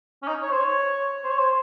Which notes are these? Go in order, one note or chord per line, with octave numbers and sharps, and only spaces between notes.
C#4
D#4
C#5
C5
C#5
C5
C#5
C5